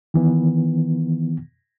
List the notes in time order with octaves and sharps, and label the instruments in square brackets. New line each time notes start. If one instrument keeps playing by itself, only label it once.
[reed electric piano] D#3 E3 B3